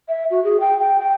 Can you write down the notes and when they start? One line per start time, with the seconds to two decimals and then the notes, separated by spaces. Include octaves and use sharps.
0.09 E5
0.30 F#4
0.44 G#4
0.60 G5
0.80 G5
0.99 G5